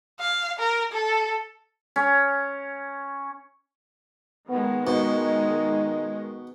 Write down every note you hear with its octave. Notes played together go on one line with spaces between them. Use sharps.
F5
A#4
A4
C#4
D#3 G#3 B3
B2 D#4